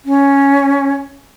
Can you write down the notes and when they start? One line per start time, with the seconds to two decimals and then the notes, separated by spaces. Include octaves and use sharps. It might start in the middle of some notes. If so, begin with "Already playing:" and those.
0.05 C#4